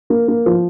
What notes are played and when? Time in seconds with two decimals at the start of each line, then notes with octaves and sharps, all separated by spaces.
0.10 A#3
0.28 A#3
0.46 F3